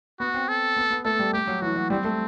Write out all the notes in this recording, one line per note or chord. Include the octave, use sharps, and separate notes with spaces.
B3 F#4
C4
A4
B3
B3
A3 A4
G3
A3 G4
F#3
E3 F#4
F#3
G3 C4
A3